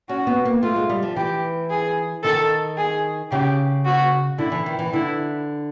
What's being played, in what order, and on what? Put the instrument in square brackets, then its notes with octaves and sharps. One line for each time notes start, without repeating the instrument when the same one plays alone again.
[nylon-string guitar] C#4 [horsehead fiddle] F#4
[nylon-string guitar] B3
A#3
[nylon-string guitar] A3 [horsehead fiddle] F4
[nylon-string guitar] G#3
G3
F3
[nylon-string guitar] E3 [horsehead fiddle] G4
[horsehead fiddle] G#4
[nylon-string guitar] D#3 [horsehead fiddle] A4
[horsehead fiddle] G#4
[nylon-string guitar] C#3 [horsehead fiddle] G4
[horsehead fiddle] F#4
[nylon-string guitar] D3 [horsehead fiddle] E4
[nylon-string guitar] E3
D#3
E3
[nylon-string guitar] D3 [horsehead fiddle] E4